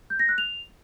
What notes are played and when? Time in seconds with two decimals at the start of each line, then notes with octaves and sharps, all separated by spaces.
0.10 G6
0.19 A#6
0.29 F#6
0.38 F7